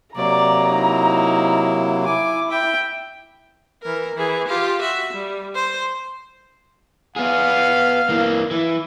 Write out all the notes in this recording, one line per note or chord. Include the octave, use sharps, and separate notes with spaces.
C3 F#3 A#3 D5 A#5
D#4 E4
E4 G#5 D6
E5 G5
E3 A#4
E3 G#4
F4 G4
F#4 E5
G3
C5
B3 G#4 F5
E3 A#3
E3